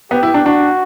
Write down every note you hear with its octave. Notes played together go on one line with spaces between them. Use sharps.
B3 G4
E4
D4
D4 F#4